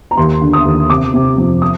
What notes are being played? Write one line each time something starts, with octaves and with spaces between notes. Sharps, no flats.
A#5
D#2 C6
D3
D#6
D#2
C3 D6
C3
F2
D#6